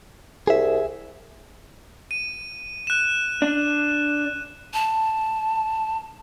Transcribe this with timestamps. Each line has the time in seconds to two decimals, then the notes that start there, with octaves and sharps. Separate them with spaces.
0.47 C2 G#4 E5
2.11 D#7
2.87 F#6 E7
3.42 D4
4.74 A5